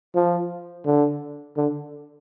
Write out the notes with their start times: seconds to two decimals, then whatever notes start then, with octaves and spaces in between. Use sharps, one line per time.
0.15 F3
0.86 D3
1.57 D3